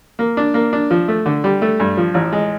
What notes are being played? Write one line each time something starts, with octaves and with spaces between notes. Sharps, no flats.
A#3
D4
A#3
D4
F3
A3
D3
G3
A3
G2
F3
A1
G#3